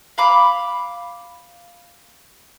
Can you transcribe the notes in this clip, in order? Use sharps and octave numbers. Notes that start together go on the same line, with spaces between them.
F5 B5 D6